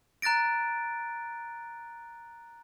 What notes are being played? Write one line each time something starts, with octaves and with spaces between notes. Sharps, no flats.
A#5 F#6 A6 A#6 D7